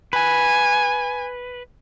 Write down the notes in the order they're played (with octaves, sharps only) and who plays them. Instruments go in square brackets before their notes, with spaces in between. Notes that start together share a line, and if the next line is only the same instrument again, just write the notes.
[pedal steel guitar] B4 [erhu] G#5